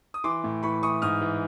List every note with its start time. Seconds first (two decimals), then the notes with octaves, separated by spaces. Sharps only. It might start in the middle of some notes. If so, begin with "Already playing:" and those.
0.14 D#6
0.24 E3 C6 D6
0.44 A2
0.63 E3 B5 C#6
0.83 E3 C#6 D#6
1.02 G#2 D#6 F6
1.21 E3